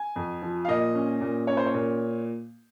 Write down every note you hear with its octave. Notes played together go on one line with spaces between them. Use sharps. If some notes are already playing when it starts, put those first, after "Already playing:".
Already playing: G#5
F2
F3
F5
A#2 D#5
C#4
A#2
C#4 C#5
C5
C#5
A#2